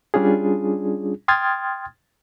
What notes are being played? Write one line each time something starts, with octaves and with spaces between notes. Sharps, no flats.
G3 C#4 D4 F4 G#4
G5 C6 D#6 F6 G#6 A6